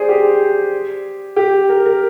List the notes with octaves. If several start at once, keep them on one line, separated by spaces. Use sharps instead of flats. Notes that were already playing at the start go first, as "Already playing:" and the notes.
Already playing: G#4 C5 D5
G4
G4
A#4
A#4